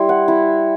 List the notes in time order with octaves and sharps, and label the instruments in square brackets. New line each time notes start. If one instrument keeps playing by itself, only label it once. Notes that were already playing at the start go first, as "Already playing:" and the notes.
Already playing: [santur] G3 E4 C6
F#5
E4